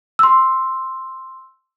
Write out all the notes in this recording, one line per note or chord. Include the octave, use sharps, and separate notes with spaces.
C6 E6